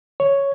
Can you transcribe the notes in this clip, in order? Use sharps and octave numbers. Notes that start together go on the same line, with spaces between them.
C#5